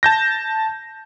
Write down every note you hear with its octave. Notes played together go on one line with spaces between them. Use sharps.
A5 G6 A#6